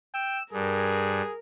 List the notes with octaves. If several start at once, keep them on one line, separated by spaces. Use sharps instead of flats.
G5 E6
G2 G#4 A#4